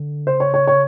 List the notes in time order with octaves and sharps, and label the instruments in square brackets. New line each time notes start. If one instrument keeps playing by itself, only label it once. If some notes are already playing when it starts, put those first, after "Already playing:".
Already playing: [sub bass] D3
[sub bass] C#3 [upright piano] C5
[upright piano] C#5
C#5
C#5